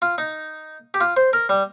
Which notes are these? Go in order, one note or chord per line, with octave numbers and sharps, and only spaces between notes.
F4
D#4
G4
F4
C5
A#4
G3